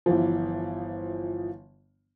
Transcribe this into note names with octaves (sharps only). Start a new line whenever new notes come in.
G1 E3 F3